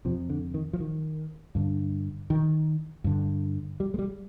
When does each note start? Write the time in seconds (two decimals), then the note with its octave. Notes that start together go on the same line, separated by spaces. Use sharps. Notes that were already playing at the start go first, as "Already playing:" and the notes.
0.05 F2 C3 F3
0.29 D3
0.54 D#3
0.73 F3
0.80 D#3
1.55 G2 D3
2.30 D#3
3.04 G2 D3
3.80 G3
3.94 G#3
3.99 G3